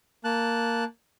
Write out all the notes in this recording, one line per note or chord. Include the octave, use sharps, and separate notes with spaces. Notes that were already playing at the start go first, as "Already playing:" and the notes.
A#3 A5 F#6